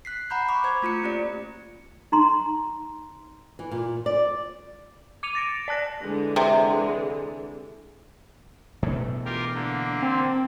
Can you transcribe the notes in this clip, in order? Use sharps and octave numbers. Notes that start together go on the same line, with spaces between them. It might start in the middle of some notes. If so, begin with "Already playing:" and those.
F#6 B6 C7
F#5 A#5 B5 G6
B5 C#6 D6
C5 G#6
A3 F4 A#5 C#7
A#3 C#4 G4 D5
D#4 A#5 C6
E3
A#2
D5
D6 C#7 D#7 F7
A6 A#6 D7
D5 A5 F#6 A#6
D3 E3 G#3
C3
B2 E3 A3
F4 G4 A#4
D3 A#3
C4